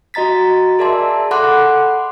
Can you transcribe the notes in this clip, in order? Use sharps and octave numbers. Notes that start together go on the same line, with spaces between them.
F#4 D#5 A#5 A6 B6
G#4 A#4 D5 E5 A5 C6
A4 F#5 B5 C6 D6 F#6